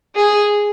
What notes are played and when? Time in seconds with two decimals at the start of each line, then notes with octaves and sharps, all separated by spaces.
0.16 G#4